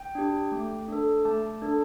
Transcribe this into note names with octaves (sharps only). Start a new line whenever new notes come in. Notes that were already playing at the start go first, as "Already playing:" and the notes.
Already playing: G5
D4 G4
A3
D4 A4
A3 A5
D4 A4